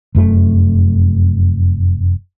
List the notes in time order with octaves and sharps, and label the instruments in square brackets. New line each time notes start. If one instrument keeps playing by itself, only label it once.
[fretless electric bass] F1 F#2 A3